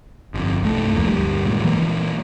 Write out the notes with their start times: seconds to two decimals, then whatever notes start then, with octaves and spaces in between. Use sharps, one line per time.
0.34 G1 F2
0.61 C2 G2 A3
0.94 G1 E2 F3 A#3
1.05 G1 D2 D3 G3
1.45 G#1 C#2 A#2
1.65 A#2 E3 F#3 A#3